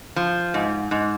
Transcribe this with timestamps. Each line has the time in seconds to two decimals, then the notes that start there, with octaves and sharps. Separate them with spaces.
0.16 F3
0.54 G#2
0.91 G#2